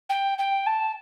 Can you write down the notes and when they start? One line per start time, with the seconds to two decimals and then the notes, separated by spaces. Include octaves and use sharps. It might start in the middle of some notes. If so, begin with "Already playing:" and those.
0.09 G5
0.38 G5
0.66 A5